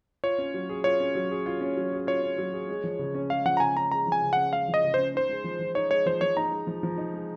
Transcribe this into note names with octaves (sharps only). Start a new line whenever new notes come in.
F4 C#5
C#4
F#3
G#4
F4 C#5
C#4
F#3
G#4
F4
C#4
F#3
G#4
F4 C#5
C#4
F#3
G#4
G#3
F3
C#3
C#4
G#3 F5
F3 F#5
A#5
C#3 G#5
C#4 A#5
G#3 A#5
F3
G#5
C#3
C#4 F#5
G#3 F5
F3
D#5
C#3
C#4 C5
D#4 C5
G#3
F3
F3
D#4 C#5
G#3 C#5
F3 C5
F3 C#5
D#4 A#5
G#3
F3
F3
D#4
G#3